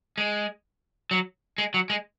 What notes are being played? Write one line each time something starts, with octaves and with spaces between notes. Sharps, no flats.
G#3
F#3
G#3
F#3
G#3